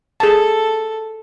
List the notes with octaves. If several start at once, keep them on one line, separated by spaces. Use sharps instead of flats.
G#4 A4 A5